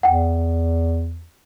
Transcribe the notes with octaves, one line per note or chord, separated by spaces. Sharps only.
E2 F#5 G5